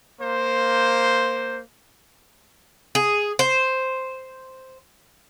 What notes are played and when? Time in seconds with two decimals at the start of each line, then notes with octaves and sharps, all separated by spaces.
0.21 A#3 C5
2.95 G#4
3.39 C5